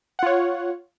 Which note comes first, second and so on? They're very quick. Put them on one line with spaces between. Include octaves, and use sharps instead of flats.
F#5 F4 C#5